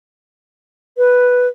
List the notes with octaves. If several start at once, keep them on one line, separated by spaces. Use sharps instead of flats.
B4